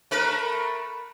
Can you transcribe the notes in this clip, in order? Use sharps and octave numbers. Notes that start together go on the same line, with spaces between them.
A3 A#4 B4